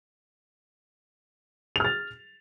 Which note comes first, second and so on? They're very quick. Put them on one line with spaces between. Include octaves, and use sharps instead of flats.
F7 F6 A6